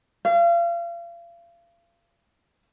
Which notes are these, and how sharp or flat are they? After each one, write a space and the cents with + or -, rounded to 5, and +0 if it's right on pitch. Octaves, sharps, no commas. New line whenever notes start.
F5 -35